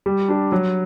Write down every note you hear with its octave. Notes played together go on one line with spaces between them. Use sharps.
G3
D4 G4
F#3